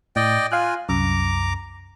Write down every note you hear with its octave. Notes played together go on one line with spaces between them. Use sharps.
A2 D5 D#5 G5
F4 F5 G#5 F6 F#6
C2 F#2 A#5 D6